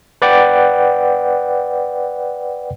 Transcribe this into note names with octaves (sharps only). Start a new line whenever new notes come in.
B4 D5 F#5 G5